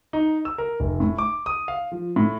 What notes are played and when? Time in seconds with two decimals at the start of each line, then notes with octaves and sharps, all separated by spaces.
0.13 D#4
0.45 E6
0.58 A#4
0.80 F1
1.00 A2
1.18 D6
1.46 D#6
1.68 F5
1.92 F3
2.16 A2